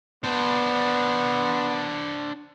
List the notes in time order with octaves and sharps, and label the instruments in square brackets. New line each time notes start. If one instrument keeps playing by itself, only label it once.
[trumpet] B3 [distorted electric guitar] D4 C5